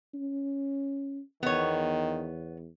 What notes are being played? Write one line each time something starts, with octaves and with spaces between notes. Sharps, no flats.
C#4
E2 D#3 B3 C#5